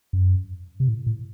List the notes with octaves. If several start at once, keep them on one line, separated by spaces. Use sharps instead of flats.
F#2
C3
A2
A2